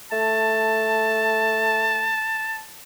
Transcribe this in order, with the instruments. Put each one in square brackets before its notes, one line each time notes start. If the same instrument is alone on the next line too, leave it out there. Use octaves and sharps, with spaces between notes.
[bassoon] A3 [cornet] A5